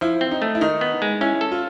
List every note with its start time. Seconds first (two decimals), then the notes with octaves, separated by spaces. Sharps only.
0.01 F3 E4
0.21 C4
0.31 D#4
0.42 A3
0.55 E4
0.61 D#3 D#4
0.81 B3
1.02 G#3
1.21 C#4 E4
1.41 A4
1.52 F4